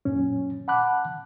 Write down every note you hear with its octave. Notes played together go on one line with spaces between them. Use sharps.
F#2 A#2 C#4
F#5 A5 B5 D6 F#6